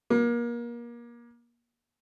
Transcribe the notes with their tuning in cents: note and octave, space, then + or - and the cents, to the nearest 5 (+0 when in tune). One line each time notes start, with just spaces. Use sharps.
A#3 +30